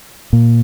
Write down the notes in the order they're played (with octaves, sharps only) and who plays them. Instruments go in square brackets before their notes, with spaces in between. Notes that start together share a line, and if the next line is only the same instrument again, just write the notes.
[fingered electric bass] A#2